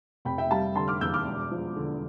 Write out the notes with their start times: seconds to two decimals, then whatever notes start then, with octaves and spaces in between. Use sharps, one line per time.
0.25 F1 G5 B5
0.38 E5 G5
0.51 G3 F5 A5
0.75 D3 A5 C6
0.88 D6 F6
1.01 E2 E6 G6
1.14 D6 F6
1.26 E1
1.51 F3
1.76 D3